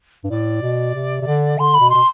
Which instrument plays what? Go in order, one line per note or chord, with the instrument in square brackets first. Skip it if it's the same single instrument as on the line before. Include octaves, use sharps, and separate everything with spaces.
[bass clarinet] G2
[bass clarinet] A2 [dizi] D5
[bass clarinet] B2
C3
C3
D3
[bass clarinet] D3 [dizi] C6
[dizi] B5
[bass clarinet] B2
[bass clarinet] B2 [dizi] C6